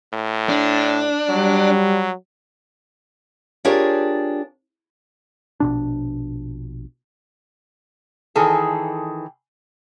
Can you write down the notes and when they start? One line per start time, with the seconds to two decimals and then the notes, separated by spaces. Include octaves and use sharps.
0.13 A2
0.49 D4
1.30 F#3 G3
3.65 D4 F4 G4 G#4 A#4 C#5
5.60 A#1 B2 D4
8.36 D#3 E3 G#4 A4